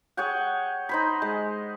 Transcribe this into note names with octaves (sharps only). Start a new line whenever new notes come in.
G#4 C#5 F#5 G5
D#4 C5 B5
G#3